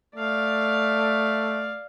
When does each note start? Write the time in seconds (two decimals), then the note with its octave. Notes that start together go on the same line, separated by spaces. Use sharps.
0.16 A3 D5 F5